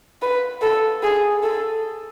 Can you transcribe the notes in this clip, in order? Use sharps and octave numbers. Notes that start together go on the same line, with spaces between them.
B4
A4
G#4
A4